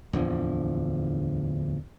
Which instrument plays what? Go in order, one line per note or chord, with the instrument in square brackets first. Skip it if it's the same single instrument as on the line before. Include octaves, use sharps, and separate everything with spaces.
[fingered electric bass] D1 E2 D3 F3